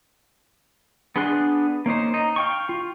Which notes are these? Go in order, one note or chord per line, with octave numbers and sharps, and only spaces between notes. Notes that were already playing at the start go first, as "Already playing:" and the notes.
B3 D4 G#4 C6 F#6
A#3 C#4 D#4 C5
D#4
F5 G5 C#6
F4